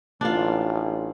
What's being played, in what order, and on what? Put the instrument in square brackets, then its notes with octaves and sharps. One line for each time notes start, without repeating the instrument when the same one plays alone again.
[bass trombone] A1 [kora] D4 F4